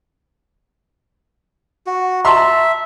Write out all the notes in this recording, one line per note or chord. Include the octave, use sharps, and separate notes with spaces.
F#4
E5 A5 A#5 C6